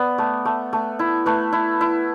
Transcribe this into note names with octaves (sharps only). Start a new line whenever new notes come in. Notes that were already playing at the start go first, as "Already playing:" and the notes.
Already playing: B3 D5
A3
A3
A3
E4
A3 B4
E4
E4